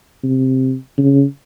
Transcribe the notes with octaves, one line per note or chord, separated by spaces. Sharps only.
C3
C#3